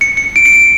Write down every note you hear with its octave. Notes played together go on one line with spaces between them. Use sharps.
C#7
C#7
D7
C#7
D7